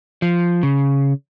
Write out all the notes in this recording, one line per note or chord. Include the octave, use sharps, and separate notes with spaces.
F3
C#3